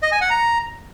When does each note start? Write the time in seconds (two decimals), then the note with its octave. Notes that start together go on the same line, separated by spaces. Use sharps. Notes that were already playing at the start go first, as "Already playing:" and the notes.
0.03 D#5
0.12 G#5
0.21 F#5
0.30 A#5